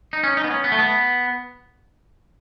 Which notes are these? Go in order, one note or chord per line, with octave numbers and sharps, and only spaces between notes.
D#4
C#4
D#4
B3
C#4
B3
A3
B3